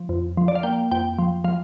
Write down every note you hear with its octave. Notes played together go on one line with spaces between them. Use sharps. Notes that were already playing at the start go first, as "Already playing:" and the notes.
Already playing: F3
F2
F3
D5
F5
A#3 G5
F2 G5
F3
F3 F5